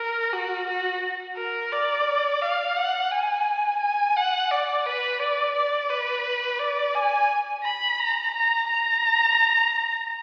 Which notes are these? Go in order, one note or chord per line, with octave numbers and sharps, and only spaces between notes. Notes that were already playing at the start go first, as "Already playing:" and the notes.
Already playing: A#4
F#4
F#4
A#4
D5
F5
F#5
G#5
G#5
F#5
D5
B4
D5
D5
B4
D5
G#5
B5
A#5
A#5
A#5